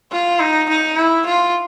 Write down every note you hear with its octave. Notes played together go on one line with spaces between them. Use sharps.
F4
D#4
D#4
E4
F4